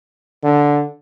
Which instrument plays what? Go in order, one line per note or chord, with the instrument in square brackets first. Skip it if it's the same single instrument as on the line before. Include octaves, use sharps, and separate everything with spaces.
[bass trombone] D3